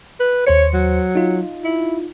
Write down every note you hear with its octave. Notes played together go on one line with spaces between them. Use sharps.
B4
D#2 C5 C#5 C#7
F#3
D#4 F4
E4